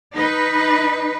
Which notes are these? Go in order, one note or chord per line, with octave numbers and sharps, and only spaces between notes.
D#4 B4